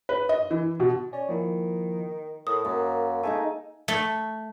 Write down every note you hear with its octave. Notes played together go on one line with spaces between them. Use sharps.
B4
D#5
E3
B2
C#4 D5
D#3 F3 A#3 E4
A2 A#4 D#6
F#2 A#3
A3 D#4 G#4 G#5
A3